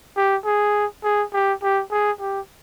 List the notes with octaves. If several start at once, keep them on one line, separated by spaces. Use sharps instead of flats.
G4
G#4
G#4
G4
G4
G#4
G4